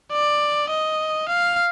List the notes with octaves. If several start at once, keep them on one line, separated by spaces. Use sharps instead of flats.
D5
D#5
F5